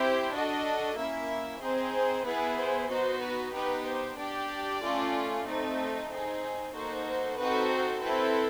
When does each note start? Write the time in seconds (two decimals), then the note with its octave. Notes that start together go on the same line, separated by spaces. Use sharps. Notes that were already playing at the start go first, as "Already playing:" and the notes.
Already playing: C4 E4 G4 C5
0.34 D4 F#4 A4 D#5
0.98 A#3 C#4 E4 E5
1.61 C4 D#4 G#4 C5
1.94 C5
2.26 B3 E4 G#4 B4
2.58 C5
2.90 B3 D#4 F#4 C5
3.22 B4
3.54 B3 D#4 G4 B4
3.86 C5
4.18 D4 G4 D5
4.82 A3 C#4 F4
5.47 A3 C4 D#4
6.11 C4 D#4 G#4
6.74 A#3 D#4 F#4 A4 C5
7.07 C5
7.38 C4 D#4 F#4 A4 B4
7.71 C5
8.02 C4 E4 A4 B4